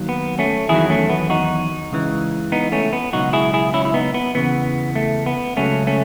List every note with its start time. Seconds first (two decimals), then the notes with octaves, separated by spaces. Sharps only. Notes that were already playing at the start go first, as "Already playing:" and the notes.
Already playing: D#2 D#3 F#3
0.09 B3
0.39 A3 C#4
0.69 E2 D#3 F#3 E4 G#4
0.90 A3 C#4
1.10 B3
1.30 D#4 F#4
1.91 C#2 C#3 E3
2.52 B3 D#4
2.72 A3 C#4
2.93 B3
3.13 C#2 B2 F#3 D#4 F#4
3.33 E4 G#4
3.54 E4 G#4
3.74 C#4 E4
3.85 E4
3.94 B3 D#4
4.14 B3
4.35 E2 C#3 E3 B3
4.96 A3
5.26 B3
5.56 C#2 C#3 F#3 A3 C#4
5.87 A3 C#4